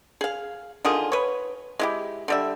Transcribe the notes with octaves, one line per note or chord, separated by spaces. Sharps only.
G#4 F5
D3 D#3 F4 G#4
B4 C#5
G#3 E4 G4
D3 G3 E5